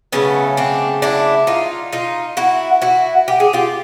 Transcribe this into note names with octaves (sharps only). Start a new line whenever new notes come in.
C#3 F#3 A3 B3 C#4
C4 D4
D4 E4
D#4 F4
D#4 F4
E4 F#4
E4 F#4
G4
G#4
F4 G4